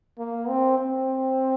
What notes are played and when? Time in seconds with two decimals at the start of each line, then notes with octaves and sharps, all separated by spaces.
0.19 A#3
0.48 C4
0.78 C4